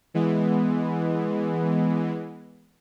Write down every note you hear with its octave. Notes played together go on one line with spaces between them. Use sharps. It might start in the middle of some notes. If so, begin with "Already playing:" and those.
E3 G#3 B3